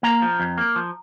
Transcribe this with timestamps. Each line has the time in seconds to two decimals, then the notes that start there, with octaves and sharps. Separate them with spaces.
0.03 A#3 A#5
0.22 F3
0.40 F2
0.58 A#3
0.76 F3